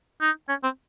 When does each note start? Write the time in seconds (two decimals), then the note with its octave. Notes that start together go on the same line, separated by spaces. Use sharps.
0.22 D#4
0.49 C#4
0.64 C4